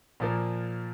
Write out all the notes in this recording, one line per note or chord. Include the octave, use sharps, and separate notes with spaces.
A#2 F3 A#3